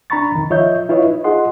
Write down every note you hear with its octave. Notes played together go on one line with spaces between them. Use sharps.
D4 A#5 B5 C#6 A6
C2 F2 D#3
F3 F4 C#5 D#5 E5 G6
E4 F4 B4 C#5 D#5
D#4
F4 G#4 D#5 F#5 C6